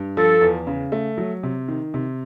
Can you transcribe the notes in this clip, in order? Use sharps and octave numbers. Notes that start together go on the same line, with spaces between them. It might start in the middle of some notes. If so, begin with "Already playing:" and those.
Already playing: G2
F3 A4
E2
C#3
A3
F#3
C3
D#3
C3